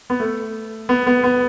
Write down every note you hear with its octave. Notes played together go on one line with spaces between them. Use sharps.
B3
A3
B3
B3
B3